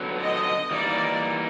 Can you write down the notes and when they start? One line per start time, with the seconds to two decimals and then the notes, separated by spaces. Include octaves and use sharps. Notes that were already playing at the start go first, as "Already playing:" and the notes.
Already playing: D3 F#3 B3
0.21 D#5
0.71 E3 G3 A#3 D#4 D5